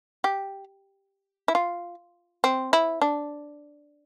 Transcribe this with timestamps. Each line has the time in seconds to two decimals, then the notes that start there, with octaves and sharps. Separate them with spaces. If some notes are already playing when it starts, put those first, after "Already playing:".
0.24 G4
1.48 E4
1.55 F4
2.44 C4
2.73 E4
3.02 D4